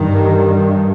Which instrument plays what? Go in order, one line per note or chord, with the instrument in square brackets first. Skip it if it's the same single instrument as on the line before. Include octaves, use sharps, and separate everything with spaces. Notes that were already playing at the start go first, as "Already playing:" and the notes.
Already playing: [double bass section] G2 D#3